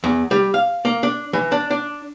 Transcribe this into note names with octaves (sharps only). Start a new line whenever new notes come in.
E2
G3
F5
A#3
D4
E3
D4
D4